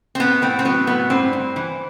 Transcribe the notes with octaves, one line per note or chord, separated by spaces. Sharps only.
C4
A2 B3
A2 C4
C4
F#3 B3
A2 B3
G2 C4
G2
E3